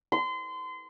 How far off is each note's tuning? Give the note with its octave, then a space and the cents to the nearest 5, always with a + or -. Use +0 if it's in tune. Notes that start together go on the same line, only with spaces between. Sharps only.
C6 -30